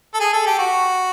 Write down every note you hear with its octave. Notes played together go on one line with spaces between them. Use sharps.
A4
G#4
A4
G4
F#4